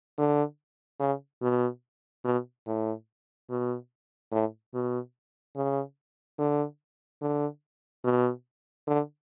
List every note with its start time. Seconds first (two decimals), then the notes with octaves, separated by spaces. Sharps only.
0.18 D3
1.00 C#3
1.42 B2
2.25 B2
2.67 A2
3.50 B2
4.32 A2
4.74 B2
5.56 C#3
6.39 D3
7.22 D3
8.04 B2
8.87 D3